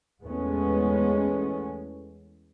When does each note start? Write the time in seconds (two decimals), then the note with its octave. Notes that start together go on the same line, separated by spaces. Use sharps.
0.21 E2 G#3 A3 B3 C#4